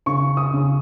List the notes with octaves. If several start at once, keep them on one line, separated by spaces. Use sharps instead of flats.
C#3 C#6
D#6
C#3